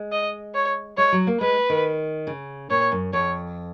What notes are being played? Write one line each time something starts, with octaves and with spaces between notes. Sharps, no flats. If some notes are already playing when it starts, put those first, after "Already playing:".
Already playing: G#3
D#5
C#5
G#3 C#5
F#3
A#3
G#3 B4
D#3
C#3
A#2 C#5
F#2
F2 C#5